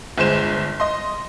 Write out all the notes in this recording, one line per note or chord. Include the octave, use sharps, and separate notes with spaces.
G1 G#3 C5 E7
D#5 C6